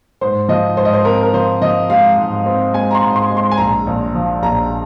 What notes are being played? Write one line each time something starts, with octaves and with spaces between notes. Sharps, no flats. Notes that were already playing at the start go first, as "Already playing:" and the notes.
G#2 C5
F3 D#5
G#2 C5
D#5
C5
C4 A#4
A#4
F3 C5
F3 D#5
G#3 F5
G#2
C4
G#3 G#5
A#5
C6
G#2
C6
G#3
C6
G#5
A#1 A#5
A#1
F3
A#1 A#5